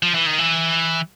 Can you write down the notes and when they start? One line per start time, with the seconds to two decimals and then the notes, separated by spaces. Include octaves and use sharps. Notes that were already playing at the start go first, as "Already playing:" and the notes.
0.03 F3
0.15 E3
0.26 D#3
0.39 E3